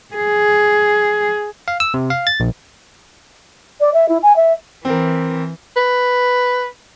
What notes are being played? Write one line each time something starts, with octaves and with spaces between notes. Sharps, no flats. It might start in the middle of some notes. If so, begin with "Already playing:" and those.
G#4
F5
E6
C3
F5
A6
A#1
D5
E5
E4
G#5
E5
E3 C4 A#4
B4